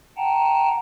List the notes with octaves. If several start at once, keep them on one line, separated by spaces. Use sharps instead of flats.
F#5 G5 A5 A#5